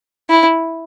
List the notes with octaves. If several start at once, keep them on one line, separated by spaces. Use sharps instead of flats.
E4